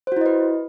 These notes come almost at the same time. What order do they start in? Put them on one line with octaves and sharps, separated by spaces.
C5 F#4 E4 D#5 B4